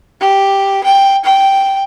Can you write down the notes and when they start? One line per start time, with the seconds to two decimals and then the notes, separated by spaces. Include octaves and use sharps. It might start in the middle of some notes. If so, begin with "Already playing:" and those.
0.21 G4
0.84 G5
1.24 G5